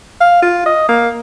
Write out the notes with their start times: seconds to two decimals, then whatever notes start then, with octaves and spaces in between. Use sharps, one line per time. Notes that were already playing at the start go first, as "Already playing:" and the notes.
0.21 F5
0.42 F4
0.66 D#5
0.89 A#3